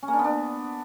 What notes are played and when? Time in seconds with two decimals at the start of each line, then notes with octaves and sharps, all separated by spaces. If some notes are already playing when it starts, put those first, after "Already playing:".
0.03 C#4
0.08 A#3
0.13 D4
0.19 B3
0.24 D4